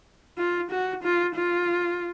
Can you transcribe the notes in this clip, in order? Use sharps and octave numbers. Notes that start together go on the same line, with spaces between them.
F4
F#4
F4
F4